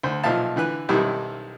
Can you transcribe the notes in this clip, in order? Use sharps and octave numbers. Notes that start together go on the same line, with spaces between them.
D2 C5
B1 A#2 F3 E5 F5 A5
D3 E3 B4 F#6
B1 F#2 C3 D#3 G3 E4